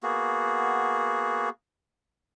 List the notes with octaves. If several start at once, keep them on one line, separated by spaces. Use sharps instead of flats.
A#3 B3 F#4 G#4